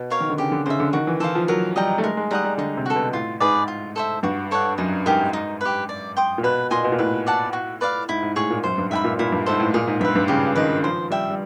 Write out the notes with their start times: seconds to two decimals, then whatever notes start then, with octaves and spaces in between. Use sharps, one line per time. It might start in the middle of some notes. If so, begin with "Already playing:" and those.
Already playing: B2
0.10 A#4 C#5 F5
0.20 D#3
0.30 D3
0.38 C#3 G4
0.52 D3
0.66 C#3 C5 E5
0.80 D3
0.93 D#3 F#4
1.07 E3
1.20 E3 A4 C5 F5
1.35 F3
1.48 F#3 A#4
1.76 G3 D#5 G5 A#5
1.98 A3
2.03 G#3 A#4
2.17 G#3
2.31 G3 D#5 F#5 A#5
2.44 G3
2.58 D3 D#4
2.77 C3
2.86 F#4 A4
2.96 B2
3.13 A2 F4
3.40 G#2 G#4 B4 D5
3.68 F4
3.96 A4 C5 E5
4.23 G2 F#4
4.51 A4 C#5 F#5
4.78 F#2 D#4
5.06 G#2 G4 A#4 D#5
5.33 D#4
5.61 G4 B4
5.89 D5
6.17 G5 C6 D#6
6.38 A#2
6.43 B2 B4
6.71 A#2 D#5 G#5 C6
6.84 B2
6.92 A#2
6.98 A2 B4
7.26 D5 F#5 A5
7.53 F#4
7.81 B4 D5 F5
8.09 G#2 E4
8.23 G#2
8.36 A2 G#4 C#5
8.50 A#2
8.64 F#2 C5
8.78 G2
8.90 G#2 E5 G5 B5
9.04 A#2
9.19 A#2 E4
9.32 G2
9.46 G#2 A4 C5 E5
9.60 A2
9.74 A#2 G#4
9.87 G#2
10.00 G2 B4 E5
10.15 G2
10.28 C#3 G4
10.55 D#3 B4 D#5
10.83 F3 C5
11.11 G3 E5 G5
11.30 G3